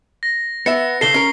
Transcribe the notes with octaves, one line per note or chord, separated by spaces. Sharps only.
A#6
B3 E5 C#7
C#3 A4 C7 G7
C#4 A#4